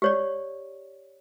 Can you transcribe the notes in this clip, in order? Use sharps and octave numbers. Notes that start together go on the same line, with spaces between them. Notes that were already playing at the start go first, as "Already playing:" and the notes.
G4 C#5 D5